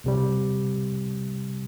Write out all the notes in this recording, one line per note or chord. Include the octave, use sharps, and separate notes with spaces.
C2 C3 G3